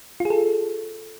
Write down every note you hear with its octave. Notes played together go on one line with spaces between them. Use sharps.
F4
G#4
A4